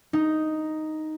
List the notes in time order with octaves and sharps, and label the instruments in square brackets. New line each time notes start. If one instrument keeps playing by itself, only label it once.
[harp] D#4